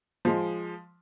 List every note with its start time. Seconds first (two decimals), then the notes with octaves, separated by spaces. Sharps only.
0.25 F3 G#3